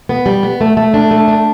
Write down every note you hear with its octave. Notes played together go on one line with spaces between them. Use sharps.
B3
G3
B3
A3
A3
D4
A3
D4